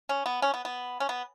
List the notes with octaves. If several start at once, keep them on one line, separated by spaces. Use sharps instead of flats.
C#4
B3
C#4
B3
B3
C#4
B3